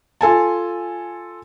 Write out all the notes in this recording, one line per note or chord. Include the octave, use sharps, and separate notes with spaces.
F4 A4 G#5 A5